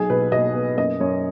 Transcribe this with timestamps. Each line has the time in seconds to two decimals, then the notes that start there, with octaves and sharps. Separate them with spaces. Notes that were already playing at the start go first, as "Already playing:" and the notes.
Already playing: B1 G#4
0.10 B2 B4
0.32 B2 D#5
0.55 B3
0.78 F#2 D#5
1.00 F#2 C#5